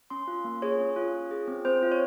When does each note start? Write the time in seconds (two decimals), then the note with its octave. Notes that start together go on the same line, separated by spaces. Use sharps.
0.10 C#4 C6
0.28 F4
0.44 A#3
0.62 G#4 C#5
0.80 C#4
0.96 F4
1.14 F4
1.31 G#4
1.48 C4
1.65 C4 C5
1.83 F4
1.92 C#5